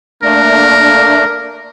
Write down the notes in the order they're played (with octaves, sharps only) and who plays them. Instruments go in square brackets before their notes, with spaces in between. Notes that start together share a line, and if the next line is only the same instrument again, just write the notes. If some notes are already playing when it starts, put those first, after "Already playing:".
[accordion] A3 A#3 D4 [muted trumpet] A#4